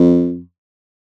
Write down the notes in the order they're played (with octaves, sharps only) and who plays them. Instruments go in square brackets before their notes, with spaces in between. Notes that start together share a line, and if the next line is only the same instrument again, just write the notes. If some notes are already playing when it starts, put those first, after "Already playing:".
Already playing: [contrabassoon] F2